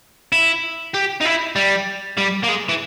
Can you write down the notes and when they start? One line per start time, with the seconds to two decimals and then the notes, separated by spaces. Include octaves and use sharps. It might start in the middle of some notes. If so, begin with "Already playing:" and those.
0.32 E4
0.94 G4
1.21 D#4
1.25 E4
1.56 G3
2.17 G3
2.43 A#3
2.48 G#3
2.69 E3